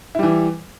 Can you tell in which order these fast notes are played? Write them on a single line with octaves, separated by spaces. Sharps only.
E4 G3 E3